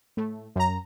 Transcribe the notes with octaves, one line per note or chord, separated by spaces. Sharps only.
A2 A3
F#2 A#5